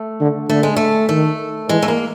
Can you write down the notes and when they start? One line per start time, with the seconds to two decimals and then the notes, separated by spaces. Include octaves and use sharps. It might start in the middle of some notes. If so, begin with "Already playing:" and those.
Already playing: A3
0.20 D3
0.49 D3 A3
0.63 G#3
0.76 A3
1.09 D#3 A3
1.69 E3 G#3
1.82 A3
1.88 A#3